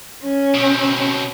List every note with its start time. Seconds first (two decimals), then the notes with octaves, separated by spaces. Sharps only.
0.24 C#4
0.54 B2 C4